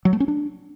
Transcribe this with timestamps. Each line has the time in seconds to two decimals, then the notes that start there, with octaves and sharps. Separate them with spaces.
0.05 F#3
0.13 A3
0.20 C#4
0.28 D4